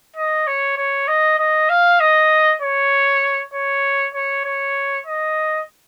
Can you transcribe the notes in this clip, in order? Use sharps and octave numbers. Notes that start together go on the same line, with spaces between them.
D#5
C#5
C#5
D#5
D#5
F5
D#5
C#5
C#5
C#5
C#5
D#5